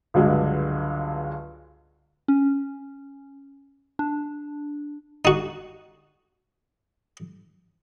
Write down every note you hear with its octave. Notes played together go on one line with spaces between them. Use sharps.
C#2 G2 D3 F#3 G#3
C#4
D4
D#4 F#4